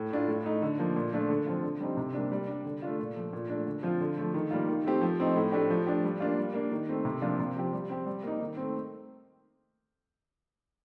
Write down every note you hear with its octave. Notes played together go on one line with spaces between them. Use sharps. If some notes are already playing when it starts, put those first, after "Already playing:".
Already playing: A2
A3 D4 F4
A2
A3 D#4
D3
F3 A#3
A#2
F3 A3 D4
D3
F3 C4 F4
D3
G3 C4 D#4 G4
C3
G3 A#3 D4
G3
D4 G4
D3
A3 D4 F4
A#2
F3 A3
A#2
A3 D4
D3
F3 C4 F4
D3
F3 A3
D#3
G3 A#3 F4
D#3
A3 C4 G4
F3
A3 C4 D#4
A2
A3 D4 G4
F3
A3 D4 G4
G3
A#3 D4 F4
G3
A#3 D4
D#3
A3 C4
C3
F3 A#3 D4 F4
C3
F3 C4 G4
G3
C4 G4
G3
A#3 D#4
D#3
A3 C4